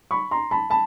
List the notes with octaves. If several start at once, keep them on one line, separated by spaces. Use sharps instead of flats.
B5 C#6
A#5 C6
A5 B5
A5 B5